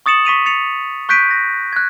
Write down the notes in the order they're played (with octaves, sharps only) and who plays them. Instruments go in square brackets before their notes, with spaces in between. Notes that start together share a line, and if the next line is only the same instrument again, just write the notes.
[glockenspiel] C#6 D#6 A6 C#7 E7 F#7
C#6 B6 D#7 F7
A6 C#7 F7
C#6 F#6 G6 B6 D7 D#7
A#6
F#6 G#6